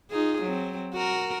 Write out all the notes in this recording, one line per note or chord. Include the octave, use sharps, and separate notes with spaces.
D#4 F4 G#4
F#3 C4
F#4 A#4